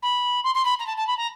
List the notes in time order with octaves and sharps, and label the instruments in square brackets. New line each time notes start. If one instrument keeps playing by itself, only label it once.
[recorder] B5
C6
C6
B5
A#5
A5
A5
B5
A#5